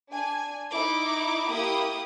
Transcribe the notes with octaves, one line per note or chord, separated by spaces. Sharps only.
D4 G#5
D#4 E4 D6
A#3 E4 G4 D#6